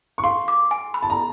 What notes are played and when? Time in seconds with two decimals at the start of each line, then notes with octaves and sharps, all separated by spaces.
0.18 C#6
0.24 F5 C6
0.48 D6
0.71 G#5
0.94 B5
1.03 A5
1.10 A#5